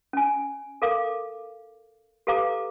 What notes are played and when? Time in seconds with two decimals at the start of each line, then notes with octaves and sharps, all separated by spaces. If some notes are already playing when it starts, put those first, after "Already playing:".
0.13 C#4 G#5
0.82 A4 A#4 F5 D6
2.27 G4 A4 B4 F5 A#5 D6